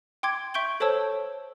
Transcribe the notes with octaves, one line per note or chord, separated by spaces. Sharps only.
G5 C6 D6 G#6
E5 C#6 G6 D7 G7
A4 C5 C#5 A5 E6